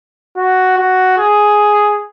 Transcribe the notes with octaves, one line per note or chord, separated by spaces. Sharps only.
F#4
F#4
G#4